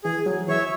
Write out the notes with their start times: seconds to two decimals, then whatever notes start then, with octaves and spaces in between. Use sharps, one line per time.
0.04 E3 G#4
0.26 F#3
0.48 E3 C#5 E5